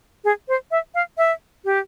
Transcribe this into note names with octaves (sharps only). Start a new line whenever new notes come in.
G#4
C5
E5
F5
E5
G4